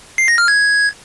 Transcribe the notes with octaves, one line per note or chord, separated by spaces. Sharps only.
C7
A#6
F6
G#6